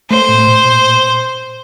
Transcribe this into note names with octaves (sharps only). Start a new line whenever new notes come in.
A3 C5
A2
A#2
A#2